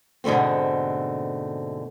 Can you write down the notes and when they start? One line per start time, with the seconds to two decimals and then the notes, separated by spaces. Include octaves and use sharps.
0.24 G#2 B2 D3 A3 C4